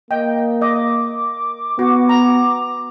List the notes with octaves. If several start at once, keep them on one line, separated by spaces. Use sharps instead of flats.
A#3 D#5 G5
D#5 D6
B3 F#4
A#5